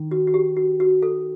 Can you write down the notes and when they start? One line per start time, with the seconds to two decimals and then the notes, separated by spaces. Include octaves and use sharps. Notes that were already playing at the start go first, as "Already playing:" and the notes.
Already playing: D#3
0.11 F#4
0.27 F#4
0.34 G4
0.57 F#4
0.80 F#4
1.03 A4